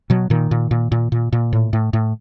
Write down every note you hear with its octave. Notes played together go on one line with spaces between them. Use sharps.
B2 F#3
A#2 D#3
A#2
A#2
A#2
A#2
A#2
A2
A2
A2